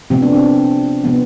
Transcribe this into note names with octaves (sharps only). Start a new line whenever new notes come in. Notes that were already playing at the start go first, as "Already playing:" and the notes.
C3 F3 B3 C4
D4
C4
C3 F3 B3